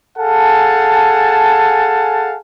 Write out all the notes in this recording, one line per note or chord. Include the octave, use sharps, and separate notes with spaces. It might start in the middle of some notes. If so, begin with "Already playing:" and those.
G#4 A4 F5 F#5 G#5 A5